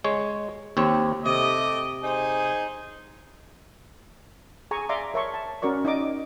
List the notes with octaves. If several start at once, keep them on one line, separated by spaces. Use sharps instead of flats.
G#3 C#5
D#2 C4 C#5
C3 A3 D#5 D6
D#4 G#4 C5
G#4 G#5 A#5 C#6
D5 E5 F5 A#5 C6 D6
A#4 C#5 E5 A5 C6 C#6
A5
C#4 F#4 A#4 D5 C#6
D#4 D5 D#5 D6